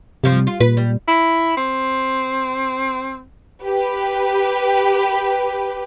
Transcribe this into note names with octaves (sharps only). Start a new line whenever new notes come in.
G2 C3 F3 C4
F4
A#2 B4
G3
E4
C4
G4 B4